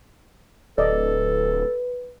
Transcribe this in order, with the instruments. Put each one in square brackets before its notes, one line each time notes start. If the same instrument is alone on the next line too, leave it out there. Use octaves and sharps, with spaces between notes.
[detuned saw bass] D1 [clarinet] A4 [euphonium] B4 [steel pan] D5 D#5